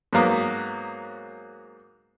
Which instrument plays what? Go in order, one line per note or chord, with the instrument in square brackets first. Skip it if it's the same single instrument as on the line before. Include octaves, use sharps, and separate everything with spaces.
[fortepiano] G#2 F#3 A#3 B3